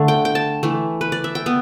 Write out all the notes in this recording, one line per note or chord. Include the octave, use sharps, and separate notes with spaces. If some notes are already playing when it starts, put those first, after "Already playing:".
Already playing: D3 A3
G5
G5
A5
E3 A3
B4
D5
E5
G5
B3